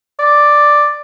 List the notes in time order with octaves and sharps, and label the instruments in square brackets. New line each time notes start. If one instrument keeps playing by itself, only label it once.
[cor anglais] D5